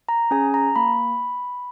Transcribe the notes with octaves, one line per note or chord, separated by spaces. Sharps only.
A#5
C#4 G#4 G#5
A#5
A#3 B5